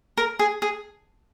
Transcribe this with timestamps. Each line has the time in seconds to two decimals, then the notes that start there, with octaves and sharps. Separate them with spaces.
0.17 A#4
0.39 G#4
0.62 G#4